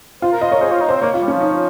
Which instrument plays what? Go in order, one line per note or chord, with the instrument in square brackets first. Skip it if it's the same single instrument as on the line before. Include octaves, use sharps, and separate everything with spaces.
[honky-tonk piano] F4 [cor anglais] C5
[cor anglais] A#4
[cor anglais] C5 [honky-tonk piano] D#5
[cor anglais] A#4 [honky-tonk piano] C#5
[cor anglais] G#4 [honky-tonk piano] C5
[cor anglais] F4
D#4
[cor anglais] C4 [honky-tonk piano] C5
[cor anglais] A#3 [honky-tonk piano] C#5
[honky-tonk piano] F4
[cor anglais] G3
[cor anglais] F3 [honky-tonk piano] C#4
[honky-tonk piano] D#4